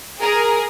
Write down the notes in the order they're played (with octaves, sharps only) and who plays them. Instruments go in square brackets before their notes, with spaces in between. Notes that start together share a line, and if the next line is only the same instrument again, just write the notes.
[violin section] G#4 A#4